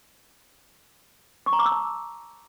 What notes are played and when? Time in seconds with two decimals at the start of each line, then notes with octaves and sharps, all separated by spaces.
1.46 C#6
1.53 A#5
1.59 D6
1.65 E6
1.72 A5